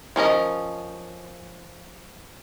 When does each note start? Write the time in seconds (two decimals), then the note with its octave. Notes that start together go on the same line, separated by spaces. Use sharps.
0.16 F3 C#4 A#4 D#5